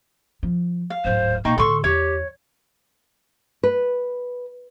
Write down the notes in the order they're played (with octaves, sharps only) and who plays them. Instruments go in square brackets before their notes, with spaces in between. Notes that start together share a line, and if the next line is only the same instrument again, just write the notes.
[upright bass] F3
[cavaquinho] F5
[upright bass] D1 G#2 [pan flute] C5
[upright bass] B2 [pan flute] A#3 [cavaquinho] D#4 G5 C#6
[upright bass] A2 D3 [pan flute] A4 [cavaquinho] C6 C#6
[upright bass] E2 [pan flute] G4 [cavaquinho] C#5
[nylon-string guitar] B4